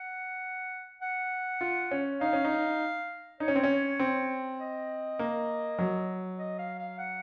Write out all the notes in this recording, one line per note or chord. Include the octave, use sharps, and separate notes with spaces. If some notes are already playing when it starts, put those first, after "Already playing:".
Already playing: F#5
F#5
F4
C#4
D#4 F5
C#4
D#4
D#4 C#5
C#4
C4
C#4
C4
D#5
A#3
F#3
D#5
F5
F5
F#5